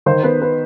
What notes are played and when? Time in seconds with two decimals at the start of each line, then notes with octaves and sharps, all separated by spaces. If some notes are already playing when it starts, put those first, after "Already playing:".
0.06 D#3 C5
0.23 B3 B4
0.41 B3 B4